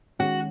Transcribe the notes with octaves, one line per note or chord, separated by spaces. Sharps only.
D#3 G#3 C#4 F#4